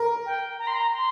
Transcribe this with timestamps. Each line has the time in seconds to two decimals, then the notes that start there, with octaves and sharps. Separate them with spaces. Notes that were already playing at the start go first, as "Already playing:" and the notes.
Already playing: A#4
0.26 G5
0.59 A#5
0.67 C6
0.75 A#5
0.93 C6